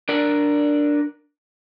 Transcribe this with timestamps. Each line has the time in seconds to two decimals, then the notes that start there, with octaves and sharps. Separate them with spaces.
0.09 D4 A#4 D5